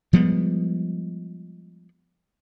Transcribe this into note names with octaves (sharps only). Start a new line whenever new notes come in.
F3 G3 G#3 B3